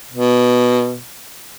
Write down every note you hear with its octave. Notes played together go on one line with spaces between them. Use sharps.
B2